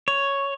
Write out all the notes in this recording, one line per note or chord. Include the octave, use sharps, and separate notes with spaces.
C#5